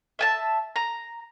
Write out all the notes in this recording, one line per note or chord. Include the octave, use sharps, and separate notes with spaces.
E5 G#5 A5
A#5